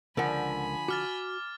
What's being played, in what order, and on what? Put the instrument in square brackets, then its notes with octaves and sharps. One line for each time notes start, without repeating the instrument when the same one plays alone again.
[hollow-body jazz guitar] C#2 A#4 F#5 [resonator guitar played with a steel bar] D3 F3 [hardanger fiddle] G#5 B5
[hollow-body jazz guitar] F#4 [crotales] D6 F6 A6